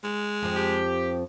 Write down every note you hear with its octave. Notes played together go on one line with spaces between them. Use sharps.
G#3
F2 F3
G4